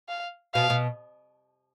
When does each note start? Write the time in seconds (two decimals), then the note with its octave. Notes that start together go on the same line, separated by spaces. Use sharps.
0.08 F5
0.54 B2 F5
0.70 B2